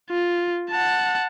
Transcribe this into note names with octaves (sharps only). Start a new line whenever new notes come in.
F4
F#5 A5